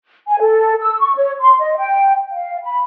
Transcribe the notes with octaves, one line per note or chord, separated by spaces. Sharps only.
G#5
A4
E6
C#6
C#5
C6
D#5
G5
F5
B5